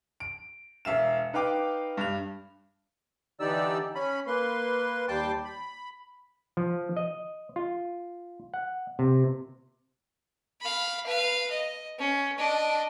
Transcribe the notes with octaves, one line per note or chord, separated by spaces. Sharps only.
D7
E1 E5 F5 E7
D#4 B4 F5 G5 D6
G2 F7
D3 E3 D#4 G4 D5 E6
C#4 B5
A#3 B4 C6
D#2 G3 G5 A5 C6 D6
B5
F3
D#5
F4
F#5
C3
F5 B5
B4 F5
D#5
C#4
D4 D#5